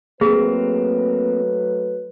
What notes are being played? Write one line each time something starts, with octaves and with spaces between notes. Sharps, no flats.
F#3 A3 A#3 C4 G#4 B4